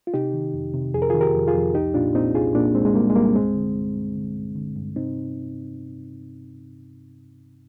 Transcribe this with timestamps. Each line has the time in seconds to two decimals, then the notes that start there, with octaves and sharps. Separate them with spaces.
0.07 F4
0.14 C3 D#4 G4
0.33 D#3
0.54 F2
0.74 C3
0.94 F2 G#4
1.02 A#4
1.10 D#3 F4 G#4
1.21 G4 A#4
1.34 F2
1.48 F4 G#4
1.55 F2
1.75 C2 D#4 G4
1.94 A#2 D4 F4
2.15 A#2 C4 D#4
2.35 C2 F4 G#4
2.55 A#2 A#3 D4
2.75 C2 G#3 C4
2.85 G#3
2.95 A#2 G3 A#3
3.10 G#3
3.15 C2 G3 A#3
3.35 G2 G#3 C4
3.55 D3
3.76 G2
3.96 G2
4.16 D3
4.36 G2
4.56 D3
4.76 G2
4.96 C3 C4 D#4